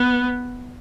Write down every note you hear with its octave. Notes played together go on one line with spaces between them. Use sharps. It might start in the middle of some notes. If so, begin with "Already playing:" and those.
Already playing: B3